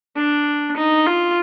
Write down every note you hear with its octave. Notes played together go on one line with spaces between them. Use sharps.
D4
D#4
F4